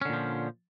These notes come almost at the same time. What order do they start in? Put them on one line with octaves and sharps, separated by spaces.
C#4 D3 A#2 F3